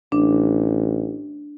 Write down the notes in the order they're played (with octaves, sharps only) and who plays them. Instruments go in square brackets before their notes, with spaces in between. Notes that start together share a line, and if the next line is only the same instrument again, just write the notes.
[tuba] A1 [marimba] D4